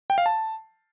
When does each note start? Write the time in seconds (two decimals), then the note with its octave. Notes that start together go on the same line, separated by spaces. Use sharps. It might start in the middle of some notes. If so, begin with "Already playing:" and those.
0.10 G5
0.18 F5
0.26 A5